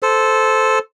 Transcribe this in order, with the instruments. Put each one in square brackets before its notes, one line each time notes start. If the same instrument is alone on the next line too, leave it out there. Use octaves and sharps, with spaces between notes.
[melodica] A4 C5